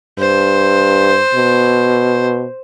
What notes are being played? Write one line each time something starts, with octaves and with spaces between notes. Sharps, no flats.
G2 C5
B2